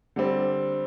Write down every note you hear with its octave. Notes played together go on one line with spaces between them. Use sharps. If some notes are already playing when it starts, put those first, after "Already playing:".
D3 G3 C4